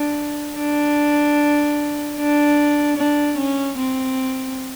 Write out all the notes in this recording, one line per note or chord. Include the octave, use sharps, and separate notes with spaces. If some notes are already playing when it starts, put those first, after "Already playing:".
Already playing: D4
D4
D4
D4
C#4
C4